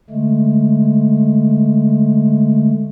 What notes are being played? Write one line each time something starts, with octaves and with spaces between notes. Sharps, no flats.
D3 G#3 A3